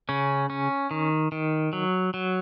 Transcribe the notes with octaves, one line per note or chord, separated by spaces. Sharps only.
C#3 C#4
C#4
D#3
D#3
F#3
F#3